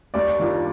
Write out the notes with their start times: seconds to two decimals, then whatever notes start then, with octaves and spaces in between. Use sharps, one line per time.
0.14 D#2 D5
0.39 D#3 G3 D4 F4